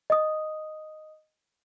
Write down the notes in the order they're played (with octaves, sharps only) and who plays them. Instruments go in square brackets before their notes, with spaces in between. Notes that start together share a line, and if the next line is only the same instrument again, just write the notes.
[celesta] D#5 D#6